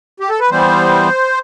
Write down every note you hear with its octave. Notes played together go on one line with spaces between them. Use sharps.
G4
A4
B4
E3 G3 B3 C5